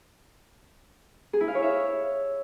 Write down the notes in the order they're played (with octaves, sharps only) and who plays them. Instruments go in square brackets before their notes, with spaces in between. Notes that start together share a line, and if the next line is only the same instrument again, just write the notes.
[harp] G#4
E4
F5
C#5
E5